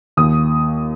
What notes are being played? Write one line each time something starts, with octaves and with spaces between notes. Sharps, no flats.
D#2 D#6